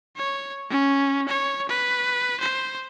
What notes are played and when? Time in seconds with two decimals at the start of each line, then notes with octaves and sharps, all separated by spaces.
0.16 C#5
0.70 C#4
1.29 C#5
1.69 B4
2.40 C5